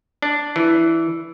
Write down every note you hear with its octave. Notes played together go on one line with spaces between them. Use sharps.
D4
E3